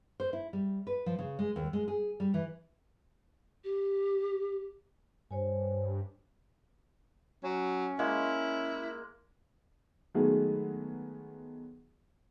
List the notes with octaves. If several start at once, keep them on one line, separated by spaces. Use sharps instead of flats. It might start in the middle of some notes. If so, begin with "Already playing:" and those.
C5
E4
G3
B4
F3
C#3
G#3
D#2
G#3
G#4
G3
E3
G4
G2 C5 C#5 G#5
F#3 C#4
G#3 A#3 E4
D#3 F#3 G#3 A3 B3 G#4